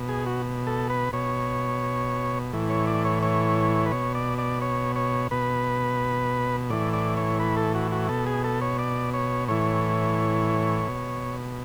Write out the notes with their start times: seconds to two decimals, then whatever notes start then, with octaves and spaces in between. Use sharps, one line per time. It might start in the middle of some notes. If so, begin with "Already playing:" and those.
Already playing: B2
0.09 G#4
0.26 F#4
0.67 A4
0.90 B4
1.13 B2 C#5
2.53 A2 E3
2.70 C#5
2.87 D5
3.05 C#5
3.23 C#5
3.86 B4
3.92 B2 C#5
4.15 D5
4.38 D5
4.62 C#5
4.96 C#5
5.31 B2 B4
6.70 A2 E3 D5
6.93 D5
7.17 C#5
7.40 B4
7.57 A4
7.75 F#4
7.92 F#4
8.09 B2 A4
8.27 G#4
8.44 A4
8.61 C#5
8.79 D5
9.14 C#5
9.48 A2 E3 C#5
10.88 B2